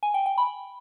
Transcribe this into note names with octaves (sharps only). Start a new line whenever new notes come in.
G#5
G5
G5
B5